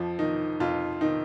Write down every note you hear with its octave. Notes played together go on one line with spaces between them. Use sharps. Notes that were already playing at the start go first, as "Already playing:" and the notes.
Already playing: F2 F3
D#3 D#4
F2 F4
D#3 D#4